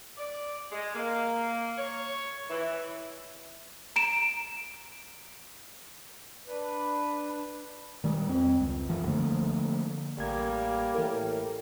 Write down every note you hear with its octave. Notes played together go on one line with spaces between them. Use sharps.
D5
G#3
A#3
C#5
E3
A#5 D7 E7
D4 B4
D#3 G3 G#3
F2 C4
C#2
F#2 E3 F3
D3 F3 A3 A#3
A1 G3 A#3 G#6
A2 E3 A#4